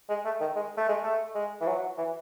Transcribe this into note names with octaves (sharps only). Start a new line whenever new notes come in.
G#3
A3
D#3
G#3
A3
G#3
A3
G#3
E3
F#3
E3